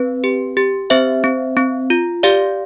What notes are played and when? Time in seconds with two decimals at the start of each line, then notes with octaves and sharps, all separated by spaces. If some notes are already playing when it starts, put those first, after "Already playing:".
Already playing: C4 B4
0.24 G4
0.57 G4
0.90 C4 C5 E5
1.24 C4
1.57 C4
1.90 F4
2.23 G4 D5 F5